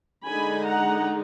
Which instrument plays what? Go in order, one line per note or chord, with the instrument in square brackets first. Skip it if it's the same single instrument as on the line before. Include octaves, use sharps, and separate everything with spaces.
[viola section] D3 G#3 D#4 G#5 B5
F#5 A#5